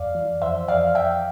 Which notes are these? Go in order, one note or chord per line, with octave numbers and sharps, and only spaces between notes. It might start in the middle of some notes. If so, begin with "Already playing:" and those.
Already playing: F2 D5 F5
E3
F2 C5 E5
F2 D5 F5
F2 E5 G5